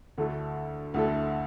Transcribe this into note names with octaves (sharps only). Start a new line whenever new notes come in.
D2 D3 A3 E4 A4
D2 D3 A3 E4 A4